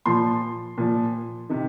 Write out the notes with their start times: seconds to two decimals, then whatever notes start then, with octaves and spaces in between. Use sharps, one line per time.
0.06 A#2 F3 C6
0.78 A#2 F3
1.49 C3 D#3